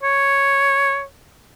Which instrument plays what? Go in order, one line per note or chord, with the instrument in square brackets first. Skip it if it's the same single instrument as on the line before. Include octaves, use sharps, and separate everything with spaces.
[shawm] C#5